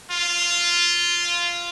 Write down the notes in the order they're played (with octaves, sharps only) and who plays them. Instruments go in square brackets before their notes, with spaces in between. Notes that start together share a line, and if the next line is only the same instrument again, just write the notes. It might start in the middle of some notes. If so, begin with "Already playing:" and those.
[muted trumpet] F4